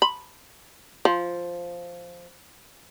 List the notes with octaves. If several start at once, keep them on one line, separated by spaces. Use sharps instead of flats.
B5
F3